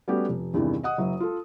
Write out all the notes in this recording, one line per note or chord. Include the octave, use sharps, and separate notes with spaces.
G3 A3 B3 C#4 F#4 G4
F1
E2 G2 C3 D#3 E3
D#5 F#5 D#6
F#1 F#3 E5
F4 A4